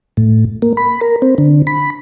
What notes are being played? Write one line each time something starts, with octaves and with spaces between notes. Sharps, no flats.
A2
A#3
B5
A#4
C4
D3
B5